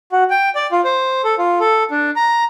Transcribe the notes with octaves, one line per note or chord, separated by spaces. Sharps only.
F#4
G5
D5
F4
C5
A4
F4
A4
D4
A#5